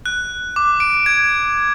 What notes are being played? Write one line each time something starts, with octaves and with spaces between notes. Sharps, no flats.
F#6
D6
D7
G#6